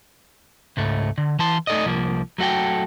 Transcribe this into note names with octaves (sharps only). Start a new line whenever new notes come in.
C#2 G#2 A3
D3
E3 A5 C6
A3 D#4 A4 D5 D#5
C2 F3 A#3
F#3 A3 F#4 A4 G5